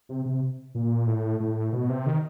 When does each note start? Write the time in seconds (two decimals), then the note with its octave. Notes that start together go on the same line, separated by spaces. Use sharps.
0.09 C3
0.25 C3
0.75 A#2
1.07 A2
1.40 A2
1.72 B2
1.89 C3
2.06 D#3